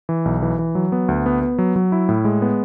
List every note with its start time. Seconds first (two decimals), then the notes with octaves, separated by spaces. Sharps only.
0.09 E3
0.25 B1
0.42 E3
0.59 E3
0.75 F#3
0.92 B3
1.08 D2
1.26 B3
1.42 B3
1.58 F#3
1.76 F#3
1.92 E4
2.09 A2
2.25 G#3
2.42 B3